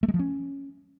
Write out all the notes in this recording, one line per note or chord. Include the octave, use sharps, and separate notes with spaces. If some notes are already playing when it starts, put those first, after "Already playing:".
A3
G#3
F3
C#4